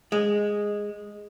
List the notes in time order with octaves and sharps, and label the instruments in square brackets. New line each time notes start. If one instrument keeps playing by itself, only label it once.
[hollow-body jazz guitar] G#3